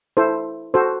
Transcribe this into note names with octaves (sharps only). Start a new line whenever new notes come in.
E4 A4 C5
F#4 A4 C5